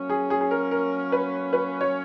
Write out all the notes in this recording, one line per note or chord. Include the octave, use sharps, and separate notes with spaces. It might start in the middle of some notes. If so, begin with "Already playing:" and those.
Already playing: F#3 A#3 C#4
G#4
G#4
G#4
A#4
A#4
B4
B4
C#5